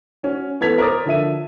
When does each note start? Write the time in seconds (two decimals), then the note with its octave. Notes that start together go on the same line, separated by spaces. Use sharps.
0.23 C#4 F#4
0.60 E3 B3 A4 G#6 B6 F7
0.78 A#4 C5 C#5 D6 D#6 A6
1.06 D3 F3 E5 D#7